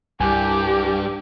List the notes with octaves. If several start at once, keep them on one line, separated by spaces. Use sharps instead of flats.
C2 G2 G4 G#5